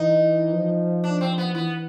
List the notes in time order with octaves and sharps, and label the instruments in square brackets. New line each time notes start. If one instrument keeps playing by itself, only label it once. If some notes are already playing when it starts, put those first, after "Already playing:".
Already playing: [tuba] E3 [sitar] D#4
[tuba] F3
[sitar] D4
C4
B3
[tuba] E3 [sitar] B3